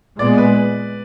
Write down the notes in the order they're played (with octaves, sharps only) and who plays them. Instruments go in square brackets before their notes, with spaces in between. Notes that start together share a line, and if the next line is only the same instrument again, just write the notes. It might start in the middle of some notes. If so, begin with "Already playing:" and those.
[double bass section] A#2 G#3 B3 [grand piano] D5
[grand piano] B4